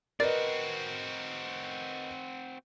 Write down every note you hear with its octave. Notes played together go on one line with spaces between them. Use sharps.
C4 F#4 A#4 B4 D5 D#5 A6 D7